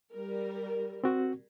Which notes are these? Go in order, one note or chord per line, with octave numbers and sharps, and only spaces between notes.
G3 A#4
C4 F#4